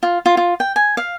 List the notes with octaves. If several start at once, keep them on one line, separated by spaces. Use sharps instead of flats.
F4
F4
F4
G5
G#5
F5